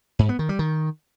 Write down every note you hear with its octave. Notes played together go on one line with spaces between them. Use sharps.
G#2
B3
D#3
G3
D#3